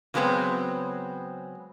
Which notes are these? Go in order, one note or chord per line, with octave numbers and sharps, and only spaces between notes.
C#3 F#3 G#3 B3 C4